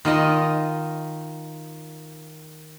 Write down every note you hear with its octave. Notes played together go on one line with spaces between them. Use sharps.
D#3 F4 D#5